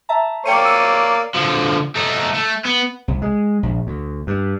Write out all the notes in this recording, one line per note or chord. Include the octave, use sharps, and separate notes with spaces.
E5 A5 A#5
A#3 C#5 D5 G5 C#7 D#7
E6 D#7
D3 F3
A3 D#4
A3
B3
C2
G#3
A#1
D2
G2